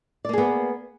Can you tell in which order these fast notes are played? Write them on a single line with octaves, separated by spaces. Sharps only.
D5 A#3 G#4 B3